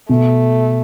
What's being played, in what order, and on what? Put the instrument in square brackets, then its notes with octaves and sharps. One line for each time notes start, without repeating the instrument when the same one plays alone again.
[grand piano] B2 [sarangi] A3